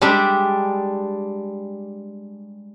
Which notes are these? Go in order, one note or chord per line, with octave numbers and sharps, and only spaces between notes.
G3 G#3 D4 E5